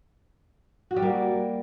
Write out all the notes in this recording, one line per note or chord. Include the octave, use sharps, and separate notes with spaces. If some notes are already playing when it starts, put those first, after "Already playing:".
F#4
G3
A#3